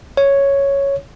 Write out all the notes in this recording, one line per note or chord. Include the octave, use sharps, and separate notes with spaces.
C#5